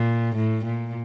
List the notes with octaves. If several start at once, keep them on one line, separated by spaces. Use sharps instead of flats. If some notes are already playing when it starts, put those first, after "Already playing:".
Already playing: A#2
A2
A#2